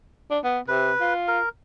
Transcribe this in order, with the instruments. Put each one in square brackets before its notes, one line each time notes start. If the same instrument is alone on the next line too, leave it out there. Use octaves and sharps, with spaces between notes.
[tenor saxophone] D4
B3
[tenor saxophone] C3 [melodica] B4
[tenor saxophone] F4
[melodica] A#4